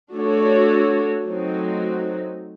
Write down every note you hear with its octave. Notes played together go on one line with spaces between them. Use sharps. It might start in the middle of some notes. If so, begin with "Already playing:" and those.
A3 D4 F#4 A4 C#5
F#3 A3 C4 D#4 F#4